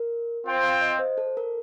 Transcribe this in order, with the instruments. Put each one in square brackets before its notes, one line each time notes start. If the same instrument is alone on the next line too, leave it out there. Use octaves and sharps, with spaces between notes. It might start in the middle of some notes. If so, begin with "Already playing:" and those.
Already playing: [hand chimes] A#4
[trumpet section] C4 F4 C5 G5
[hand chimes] F5
D#5
C5
A4
A#4